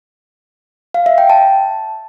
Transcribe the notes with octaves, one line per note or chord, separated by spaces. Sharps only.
F5
E5
G5
A5